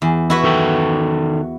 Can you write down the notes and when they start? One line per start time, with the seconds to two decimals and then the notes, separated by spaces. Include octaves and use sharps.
0.02 E2
0.30 E4 F#4 B4
0.44 D#3 A4 G5